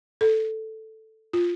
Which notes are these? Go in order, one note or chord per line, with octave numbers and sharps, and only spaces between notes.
A4
F4